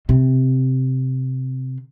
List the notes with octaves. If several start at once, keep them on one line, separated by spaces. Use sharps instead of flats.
C3 C4